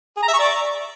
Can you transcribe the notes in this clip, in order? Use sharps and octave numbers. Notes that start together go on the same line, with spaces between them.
G#4
A#5
E5
C#6
D5